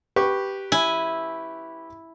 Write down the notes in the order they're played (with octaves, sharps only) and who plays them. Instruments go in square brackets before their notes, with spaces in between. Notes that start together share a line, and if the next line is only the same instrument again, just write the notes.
[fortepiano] G4 B4 C#6
[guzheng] E4 G#5